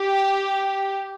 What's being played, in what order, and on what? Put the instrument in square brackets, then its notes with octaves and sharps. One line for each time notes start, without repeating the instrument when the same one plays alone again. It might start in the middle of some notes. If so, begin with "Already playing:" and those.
Already playing: [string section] G4